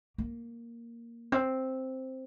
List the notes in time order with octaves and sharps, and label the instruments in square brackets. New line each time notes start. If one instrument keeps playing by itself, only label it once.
[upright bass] A#3
C4